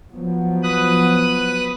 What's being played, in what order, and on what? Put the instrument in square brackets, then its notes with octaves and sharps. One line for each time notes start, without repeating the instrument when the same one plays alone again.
[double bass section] F3 F#3 B3
[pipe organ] B4 D#6 F#6